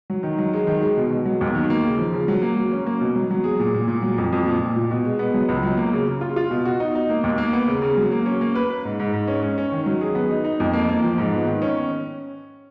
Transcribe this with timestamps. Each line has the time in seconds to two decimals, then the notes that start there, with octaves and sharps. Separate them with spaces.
0.10 F#3
0.23 D#3
0.38 F#3
0.53 G#3
0.67 D#3
0.82 G#3
0.97 B2
1.11 B2
1.25 F#3
1.41 D#2
1.55 D#3
1.70 A#3
1.84 C#3
1.98 F3
2.13 C#3
2.28 F#3
2.42 A#3
2.56 F#3
2.72 C#4
2.86 A#3
3.01 B2
3.16 F#3
3.31 F#3
3.44 G#4
3.59 A#2
3.74 A#2
3.88 A#2
4.02 F#3
4.18 F2
4.33 F2
4.46 A#2
4.61 A#2
4.76 A#2
4.91 B2
5.05 G#3
5.19 B3
5.34 F#3
5.49 C#2
5.63 F#3
5.77 A#3
5.93 C#3
6.08 C#3
6.21 F4
6.36 F4
6.51 B2
6.65 F#4
6.80 D#4
6.95 D#4
7.10 A#3
7.24 D#2
7.38 A#3
7.53 B3
7.68 C#3
7.82 C#3
7.97 F#3
8.11 A#3
8.26 C#4
8.41 A#3
8.55 B4
8.70 B4
8.85 G#2
8.99 G#2
9.13 G#2
9.28 C#4
9.42 C#4
9.58 C#4
9.72 D#3
9.86 F#3
10.01 G#4
10.15 B3
10.31 D#4
10.44 D#4
10.60 F2
10.73 A#3
10.89 A#3
11.04 F3
11.18 G#2
11.32 B3
11.46 D#3
11.62 C#4